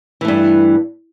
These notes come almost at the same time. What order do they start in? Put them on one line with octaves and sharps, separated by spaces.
E3 A3 G2